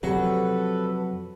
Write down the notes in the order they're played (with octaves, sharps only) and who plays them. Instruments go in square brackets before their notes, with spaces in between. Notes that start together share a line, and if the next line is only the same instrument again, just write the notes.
[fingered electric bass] F2 C3 F#3 [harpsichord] F#4 [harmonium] A4 B4